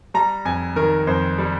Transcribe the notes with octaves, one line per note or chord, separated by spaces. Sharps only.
G3 A#5
F2 G#5
D#3 A#4
F2 C5
G3